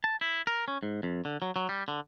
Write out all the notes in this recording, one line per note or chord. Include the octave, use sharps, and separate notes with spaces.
A5
E4
A#4
C#4
G#2
F2
D3
F#3
F#3
G3
D3